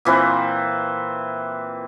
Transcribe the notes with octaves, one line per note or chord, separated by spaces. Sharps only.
A#2 E3 C4 B4